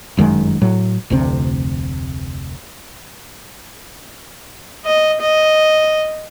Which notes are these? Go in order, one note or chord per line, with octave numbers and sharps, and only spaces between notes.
G1 F#2 D#3 G#3
A2 F#3
F1 D2 C3 C4
D#5
D#5